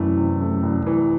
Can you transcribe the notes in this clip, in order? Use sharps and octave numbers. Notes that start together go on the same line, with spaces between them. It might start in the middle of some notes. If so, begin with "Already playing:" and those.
Already playing: C2 F#2 E3 A3
C3
A3
C2
E3